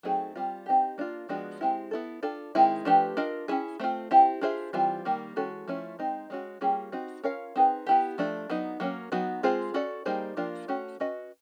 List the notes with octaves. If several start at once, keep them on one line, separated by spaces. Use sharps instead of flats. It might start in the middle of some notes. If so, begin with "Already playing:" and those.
F#3 A3 C4 D#4 G#4
G3 C4 F4
C4 D#4 G4
A#3 D4 F4
F3 G#3 B3 D4 F#4
G#3 C4 E4 G4
B3 E4 A4
D4 F4 A4
D#3 G#3 C4 E4
F3 A3 D4 G4 B4
D4 F4 A#4 D#5
C#4 E4 G#4
A3 C4 F4
C4 E4 G4
D4 F4 G#4 C5 E5
E3 G3 C4 F4
D#3 G3 A#3
E3 G#3 C#4 F#4 A4
F3 A3 C#4 E4
G#3 C4 D#4
G#3 C#4 F#4
G3 A#3 C#4 F4 G#4
C4 D#4 F#4
C#4 F4 A#4 C#5 F5
C4 D#4 G#4 B4
B3 E4 G4
F3 A3 D4
F#3 B3 D#4
F#3 A#3 C#4
F#3 B3 D#4 F#4
G#3 C4 F4 G#4 C5
C#4 F#4 A4 D5
G3 A#3 D#4 G#4 C5
F3 A#3 D4 F4
A3 C#4 F#4
C#4 F#4 B4 D#5